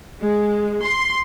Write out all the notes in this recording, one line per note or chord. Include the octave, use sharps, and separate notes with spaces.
G#3
C6